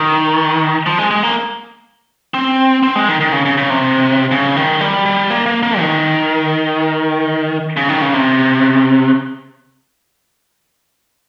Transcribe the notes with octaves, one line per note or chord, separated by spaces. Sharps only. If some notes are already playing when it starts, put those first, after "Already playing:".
Already playing: D#3
F3
G#3
G#3
A#3
C4
C4
G#3
D#3
D#3
C#3
C#3
C#3
C3
C#3
D#3
G3
G3
A#3
A#3
A#3
D#3
C#3
D#3
C#3
C3